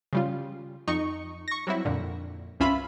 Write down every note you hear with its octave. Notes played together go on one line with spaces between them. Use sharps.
C#3 G3 F4
F2 D#4 C#6
C#6 A#6
F#3 G3 C4 E4
F2 A#2 D3
C2 G2 C#4 F4 E5 B5